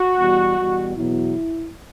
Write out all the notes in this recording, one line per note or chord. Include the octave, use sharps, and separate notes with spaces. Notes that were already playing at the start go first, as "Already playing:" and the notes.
Already playing: F#4
E2 B2 G3
E2 B2 G3
E2 B2 F#3 E4